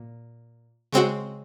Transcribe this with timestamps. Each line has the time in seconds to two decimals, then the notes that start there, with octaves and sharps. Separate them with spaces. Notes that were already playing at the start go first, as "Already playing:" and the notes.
Already playing: A#2
0.93 C#3 G#3 C4 F#4